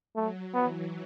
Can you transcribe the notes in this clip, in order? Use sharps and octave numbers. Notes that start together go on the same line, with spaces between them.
F#3 A3
E3 B3